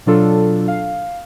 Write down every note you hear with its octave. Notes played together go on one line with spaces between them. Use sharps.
B2 F#3 D4 F4 A4
F5